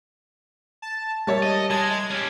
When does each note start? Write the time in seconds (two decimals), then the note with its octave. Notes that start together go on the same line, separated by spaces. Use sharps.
0.82 A5
1.27 G3 A#4 C#5 E5 A5
1.43 D#5
1.70 G#3 A5 G#6
2.11 C#4 G4